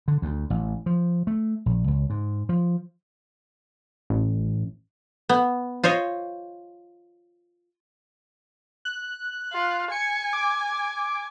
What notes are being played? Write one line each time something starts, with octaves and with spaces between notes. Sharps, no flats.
D3
D2
A1
F3
A3
A#1
C#2
G#2
F3
A1
B3
F4 C5 C#5 D#5
F#6
F4
G#5 C#7
D6